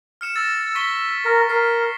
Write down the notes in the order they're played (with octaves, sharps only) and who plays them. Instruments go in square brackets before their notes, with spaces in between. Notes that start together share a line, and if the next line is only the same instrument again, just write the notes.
[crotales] F6 C#7 E7
[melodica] E6 [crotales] A6 A#6
[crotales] C#6 B6 G7
[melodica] A#4
[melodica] A#4 [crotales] C7